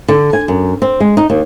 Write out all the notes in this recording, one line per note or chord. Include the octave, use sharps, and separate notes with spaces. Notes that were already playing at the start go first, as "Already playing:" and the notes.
D3
G#5
F#2
C4
G#3
D#4
D#2